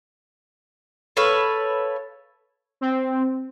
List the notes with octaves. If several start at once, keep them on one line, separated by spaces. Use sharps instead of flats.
A4 B4 C#5 F5
C4